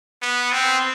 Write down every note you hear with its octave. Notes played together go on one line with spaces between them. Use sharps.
B3
C4